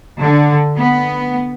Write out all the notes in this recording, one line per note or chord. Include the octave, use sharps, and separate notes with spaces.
D3
B3